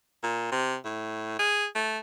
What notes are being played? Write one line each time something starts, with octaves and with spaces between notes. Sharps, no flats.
A#2
C3
A2
G#4
A3